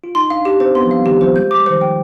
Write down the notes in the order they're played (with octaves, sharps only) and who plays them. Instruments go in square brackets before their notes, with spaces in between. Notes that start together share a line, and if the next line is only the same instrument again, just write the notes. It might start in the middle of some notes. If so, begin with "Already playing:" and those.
[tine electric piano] F4
[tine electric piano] D#4 [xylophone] C6
[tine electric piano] D4 [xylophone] F5
[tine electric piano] D4 [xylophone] G4
[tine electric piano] C4 [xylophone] C5
[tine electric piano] B3 [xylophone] C6
[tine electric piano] F3
[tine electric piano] G3 [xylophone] F5
[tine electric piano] D#3 [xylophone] G4
[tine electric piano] F3 [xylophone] C5
[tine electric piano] G#3 [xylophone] G6
[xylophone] D6
[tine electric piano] G3
[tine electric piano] D#3 [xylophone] C5
[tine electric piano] F3
[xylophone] G5